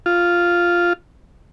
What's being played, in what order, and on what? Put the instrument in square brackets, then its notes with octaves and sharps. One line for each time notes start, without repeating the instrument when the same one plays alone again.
[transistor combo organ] F4